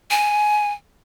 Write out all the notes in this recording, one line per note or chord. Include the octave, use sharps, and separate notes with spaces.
G#5